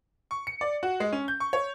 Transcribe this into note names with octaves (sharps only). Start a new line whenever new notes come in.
C#6
C#7
D5
F#4
G#3
C#4
G6
C#6
C#5